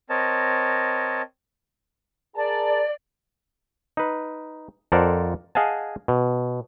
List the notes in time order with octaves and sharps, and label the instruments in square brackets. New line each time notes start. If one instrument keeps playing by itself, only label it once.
[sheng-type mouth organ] C4 A#4 C#5 D#5 A5
[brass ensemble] G#4 A#4 A5 [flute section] D5
[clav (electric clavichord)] D#4 B4
F2 A4 A#4 C5 D5 F#5
G#4 D#5 F5 F#5 G#5 A5
B2